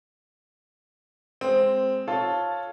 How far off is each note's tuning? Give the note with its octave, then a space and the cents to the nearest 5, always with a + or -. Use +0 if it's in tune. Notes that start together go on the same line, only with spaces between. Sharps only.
G#3 +0 C4 +0
F4 +0 A4 +0 C#5 +0